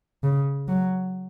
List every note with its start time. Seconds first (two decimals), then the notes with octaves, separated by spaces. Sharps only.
0.24 C#3
0.68 F#3